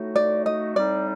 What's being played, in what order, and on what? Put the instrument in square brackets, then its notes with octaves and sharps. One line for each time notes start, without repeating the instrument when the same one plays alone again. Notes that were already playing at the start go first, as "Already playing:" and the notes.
Already playing: [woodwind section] A2 A3 D#4 F#4
[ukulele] D5
D#5
[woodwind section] A2 G3 C4 D#4 [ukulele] D5